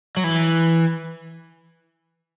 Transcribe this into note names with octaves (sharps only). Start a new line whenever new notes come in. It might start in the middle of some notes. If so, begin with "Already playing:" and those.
F#3
E3